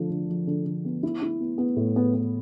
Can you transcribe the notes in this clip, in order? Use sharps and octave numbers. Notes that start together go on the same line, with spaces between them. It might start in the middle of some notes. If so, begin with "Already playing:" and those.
Already playing: D3 F3
D3
F3
D3
D3
B3
E4
E4
B3
B3
A2
B3
B3